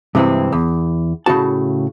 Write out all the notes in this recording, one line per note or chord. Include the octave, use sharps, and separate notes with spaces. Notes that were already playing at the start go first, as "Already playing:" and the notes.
G2 C3 E3 G#3 C4
E2
A2 C#3 G#3 F#4 A5